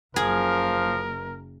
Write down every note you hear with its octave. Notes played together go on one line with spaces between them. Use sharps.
F#1 F3 G#4 A#4